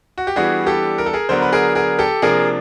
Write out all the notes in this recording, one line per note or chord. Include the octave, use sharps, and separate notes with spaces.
F#4
G4
E3 G3 B3 D4 F#4 G#4
G4 A4
A#4
A4
G#4 A#4
D3 F#3 B3 D4 A#4 C5
B4
G#4 A#4
G#4 A#4
G4 A4
C3 F3 A#3 D4 G#4 A#4